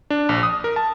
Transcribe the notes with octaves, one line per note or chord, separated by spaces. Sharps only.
D4
A#1
D#6
A#4
A5